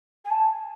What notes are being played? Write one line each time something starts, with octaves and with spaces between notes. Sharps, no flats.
G#5
A5